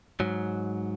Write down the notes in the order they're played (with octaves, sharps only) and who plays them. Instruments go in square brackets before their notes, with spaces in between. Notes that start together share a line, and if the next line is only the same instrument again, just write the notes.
[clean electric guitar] G#2 F#3